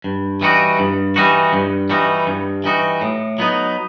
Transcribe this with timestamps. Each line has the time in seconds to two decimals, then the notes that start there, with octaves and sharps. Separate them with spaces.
0.04 G2
0.41 E3 G3 D#4 F#4
0.79 G2
1.16 E3 G3 D#4 F#4
1.53 G2
1.90 E3 G3 D#4 F#4
2.27 G2
2.64 E3 G3 D#4 F#4
3.01 A2
3.39 F#3 B3 D#4